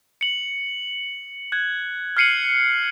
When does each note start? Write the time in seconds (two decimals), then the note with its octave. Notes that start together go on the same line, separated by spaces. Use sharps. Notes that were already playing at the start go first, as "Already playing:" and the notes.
0.21 C#7 F#7
1.52 F#6 G#6
2.17 F6 G#6 C7 C#7 D#7 F#7